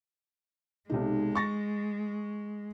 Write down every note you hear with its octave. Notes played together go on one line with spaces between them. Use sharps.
B1 C3 G#3 D#4
C#6 A6 A#6